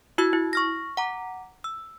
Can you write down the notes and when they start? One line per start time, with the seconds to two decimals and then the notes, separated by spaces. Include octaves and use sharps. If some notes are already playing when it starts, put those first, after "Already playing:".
0.18 E4 F#4 E6 G#6
0.33 E4
0.53 C#6 F6 A#6
0.97 F#5 A#5 D6
1.64 E6